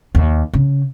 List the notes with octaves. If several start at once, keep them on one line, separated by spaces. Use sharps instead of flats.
D#2
C#3